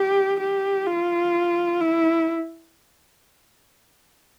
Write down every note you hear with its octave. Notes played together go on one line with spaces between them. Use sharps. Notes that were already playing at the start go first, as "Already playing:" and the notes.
Already playing: G4
G4
F4
E4